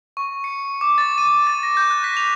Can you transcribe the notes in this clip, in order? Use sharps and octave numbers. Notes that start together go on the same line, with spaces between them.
C#6
C#7
D6
A6
D#7
A6
A#6
G6
F#6
B6
F7